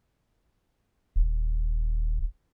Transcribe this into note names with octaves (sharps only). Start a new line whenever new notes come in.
D#1